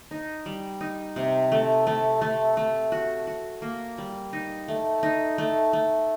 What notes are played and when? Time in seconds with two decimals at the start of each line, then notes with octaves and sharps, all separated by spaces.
0.11 D#4
0.46 G3
0.81 D#4
1.16 C3
1.52 A3
1.87 A3
2.21 A3
2.57 A3
2.92 F#4
3.27 F#4
3.62 A#3
3.98 G3
4.33 D#4
4.68 A3
5.03 D#4
5.38 A3
5.73 A3